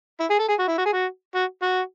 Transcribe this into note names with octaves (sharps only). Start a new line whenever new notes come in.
E4
G#4
A4
G#4
F#4
E4
F#4
G#4
F#4
F#4
F#4